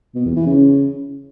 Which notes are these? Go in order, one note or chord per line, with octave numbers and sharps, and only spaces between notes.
B2
E2
E3
C#3